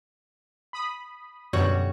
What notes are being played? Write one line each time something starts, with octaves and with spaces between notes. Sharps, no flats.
B5 D#6
F#2 B2 D3 G3 F#4 C#5